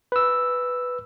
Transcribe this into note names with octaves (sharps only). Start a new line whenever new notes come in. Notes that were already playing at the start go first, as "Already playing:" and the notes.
B4 E6